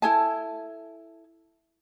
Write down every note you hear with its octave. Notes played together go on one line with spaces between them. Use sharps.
E4 A4 G#5 A5